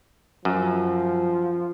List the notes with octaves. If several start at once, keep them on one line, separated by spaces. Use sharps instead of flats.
F#2 F3